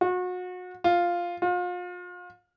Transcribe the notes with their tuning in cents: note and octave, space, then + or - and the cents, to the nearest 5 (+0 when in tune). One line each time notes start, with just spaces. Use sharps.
F#4 -35
F4 +0
F4 +35